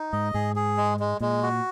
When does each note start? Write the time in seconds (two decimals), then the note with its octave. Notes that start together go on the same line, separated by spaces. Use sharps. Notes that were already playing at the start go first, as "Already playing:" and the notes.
Already playing: D#4
0.13 G#2 D#5
0.34 G#2 G#4
0.56 G#4
0.77 G#3
1.00 G#3
1.20 A#2 G#3
1.43 F#4